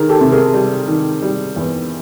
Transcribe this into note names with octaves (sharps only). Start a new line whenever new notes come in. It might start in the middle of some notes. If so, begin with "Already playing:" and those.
Already playing: D#3 G#4 A#4
G4 A4
C3
G#4 A#4
G3
D#3
G3
E2